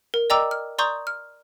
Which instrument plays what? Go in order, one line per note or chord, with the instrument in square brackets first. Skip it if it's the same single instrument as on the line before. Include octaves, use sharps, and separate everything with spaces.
[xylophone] A#4
D5 D#5 G5 A#5 D6 E6
F6
D5 A#5 C6 C#6 D#6 G6
F6